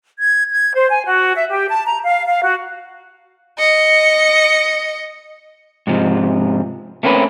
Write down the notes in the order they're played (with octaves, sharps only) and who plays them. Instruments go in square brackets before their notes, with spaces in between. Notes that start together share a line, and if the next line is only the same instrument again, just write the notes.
[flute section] G#6
G#6
C5
G#5
F#4
E5
G4
A5
A#5
F5
F5
F#4
[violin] D#5 C#7
[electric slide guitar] G#2 C3 F3
A3 A#3 C4 C#4 B4